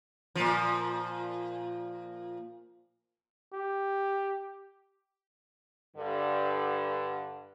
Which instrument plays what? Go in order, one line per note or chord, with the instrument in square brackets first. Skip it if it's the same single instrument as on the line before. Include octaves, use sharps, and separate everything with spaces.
[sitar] A#2 F3
[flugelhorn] G4
[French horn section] G2 D3